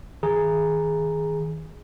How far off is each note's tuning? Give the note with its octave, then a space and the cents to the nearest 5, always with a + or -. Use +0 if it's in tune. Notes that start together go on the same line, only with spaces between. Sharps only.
D#3 +25 G#4 +0 A#5 +0